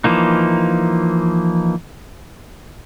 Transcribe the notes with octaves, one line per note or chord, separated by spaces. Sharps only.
E3 F3 A#3 D#4